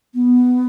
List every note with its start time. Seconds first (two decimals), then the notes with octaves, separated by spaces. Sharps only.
0.14 B3